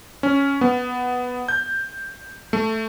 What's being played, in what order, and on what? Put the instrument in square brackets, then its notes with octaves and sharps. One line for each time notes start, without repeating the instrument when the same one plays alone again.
[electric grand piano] C#4
B3
G6
A3